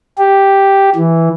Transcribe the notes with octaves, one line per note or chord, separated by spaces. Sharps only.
G4
E3